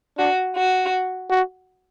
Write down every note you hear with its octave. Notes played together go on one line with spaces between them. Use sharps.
D4 F#4
F#4
F#4